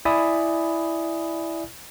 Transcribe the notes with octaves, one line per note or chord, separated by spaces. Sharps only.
E4 D5 E5 G#5 B5 D#6